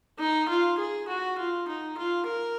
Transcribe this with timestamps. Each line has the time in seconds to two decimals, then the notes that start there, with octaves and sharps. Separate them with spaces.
0.19 D#4
0.49 F4
0.78 G#4
1.09 F#4
1.38 F4
1.68 D#4
1.98 F4
2.27 A#4